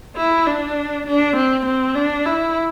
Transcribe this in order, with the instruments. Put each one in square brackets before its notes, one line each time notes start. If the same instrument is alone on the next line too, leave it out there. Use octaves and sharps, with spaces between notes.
[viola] E4
D4
D4
C4
C4
D4
E4